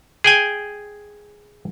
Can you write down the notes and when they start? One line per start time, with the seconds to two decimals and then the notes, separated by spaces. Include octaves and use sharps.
0.24 G#4 G5 G#5